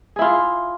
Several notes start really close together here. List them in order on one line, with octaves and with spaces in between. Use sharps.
G#4 E4 F4